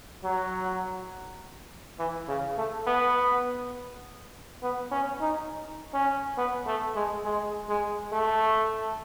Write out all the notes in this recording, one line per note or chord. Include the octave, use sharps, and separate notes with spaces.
F#3
E3
C#3
A3
B3
B3
C#4
D#4
C#4
B3
A3
G#3
G#3
G#3
A3